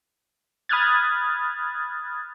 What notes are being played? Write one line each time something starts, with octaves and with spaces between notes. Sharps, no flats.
B5 D#6 F6 F#6 G#6 A6